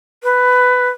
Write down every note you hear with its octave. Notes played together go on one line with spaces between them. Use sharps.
B4